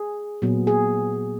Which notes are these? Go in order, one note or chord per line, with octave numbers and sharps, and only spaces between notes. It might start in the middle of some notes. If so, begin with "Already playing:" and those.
Already playing: G#4
A#2 F#3 B3
G#4